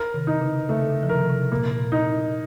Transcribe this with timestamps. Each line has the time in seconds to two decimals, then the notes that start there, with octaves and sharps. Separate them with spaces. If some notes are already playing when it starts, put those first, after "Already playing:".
Already playing: A#4
0.14 C3 D#3
0.27 D#4
0.41 C#3
0.69 C#3 A3
0.89 C#3
1.03 F3
1.09 C3 D#3 A#4
1.30 C3
1.52 A#2 A#3
1.67 A#2
1.92 D#4